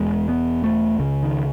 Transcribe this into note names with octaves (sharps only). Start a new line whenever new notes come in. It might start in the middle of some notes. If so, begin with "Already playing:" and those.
Already playing: E1 E2 B2 G#3
B3
A3
C#2 C#3
D#3